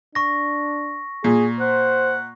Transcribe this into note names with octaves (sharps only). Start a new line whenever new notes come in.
D4 C#6 A#6
A#2 G#4
C5 F#5